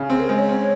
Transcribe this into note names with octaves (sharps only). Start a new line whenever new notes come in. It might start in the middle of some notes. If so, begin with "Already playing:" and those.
Already playing: C#3
C4 G#4
A#4
G#3 C5
C#5
C4